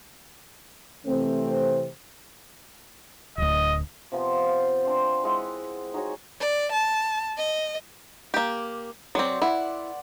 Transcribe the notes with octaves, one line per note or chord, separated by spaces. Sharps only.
C3 E3 A3 C4
D1 D2 D#5
C3 F3 B3
F5
C4 D4
G#3 E4 D#5 F#5
D#4 F#4 G#4 C#5
D5
A5
D#5
A#3 G4
F#3 C4 D5 C6
E4 F#5